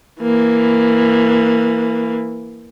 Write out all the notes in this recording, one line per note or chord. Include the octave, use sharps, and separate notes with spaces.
E3 A#3